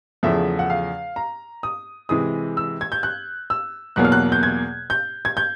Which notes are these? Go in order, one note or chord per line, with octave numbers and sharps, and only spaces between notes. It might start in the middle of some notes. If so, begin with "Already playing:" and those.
E2 C#3 F3 A3 E5
F#5
F5
A#5
D#6
C3 E3 G#3 D#6
E6
G#6
G6
F#6
E6
E2 B2 F#3 A#3 F#6
F6
F#6
G6
G#6
G6
G#6
G6